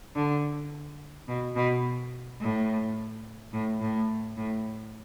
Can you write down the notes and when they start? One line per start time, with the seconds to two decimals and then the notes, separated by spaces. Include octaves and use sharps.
0.16 D3
1.28 B2
1.56 B2
2.41 A2
3.53 A2
3.81 A2
4.37 A2